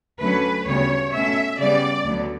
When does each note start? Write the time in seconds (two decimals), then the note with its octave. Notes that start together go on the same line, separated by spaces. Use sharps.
0.19 D2 D3 F#3 A3 C#4 B4
0.66 D2 C#3 G3 B3 C#5
1.12 B2 A3 C#4 E5
1.59 C#3 G3 B3 D5
2.05 D2 D3 F#3 B3